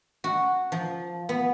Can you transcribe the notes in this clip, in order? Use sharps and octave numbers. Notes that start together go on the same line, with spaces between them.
F#4
F3
B3